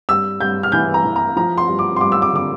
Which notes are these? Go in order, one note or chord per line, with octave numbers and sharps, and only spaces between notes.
G2 E6
G2 G6
F6
E3 G6
A#5
E3
A#5
F3 A#5
C6
G2
D6
C6
G2 D6
E6
D6
D3 D6